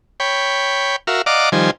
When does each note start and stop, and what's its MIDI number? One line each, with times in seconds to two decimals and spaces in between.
0.20 0.96 73
0.20 0.96 79
0.20 0.96 83
1.07 1.22 66
1.07 1.22 70
1.07 1.22 76
1.07 1.22 77
1.26 1.49 74
1.26 1.49 75
1.26 1.49 77
1.26 1.49 78
1.26 1.49 82
1.26 1.49 86
1.52 1.71 51
1.52 1.71 53
1.52 1.71 55
1.52 1.71 72
1.52 1.71 80